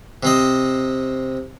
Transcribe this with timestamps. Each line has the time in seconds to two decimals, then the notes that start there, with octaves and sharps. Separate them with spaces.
0.23 C3 C4 D#5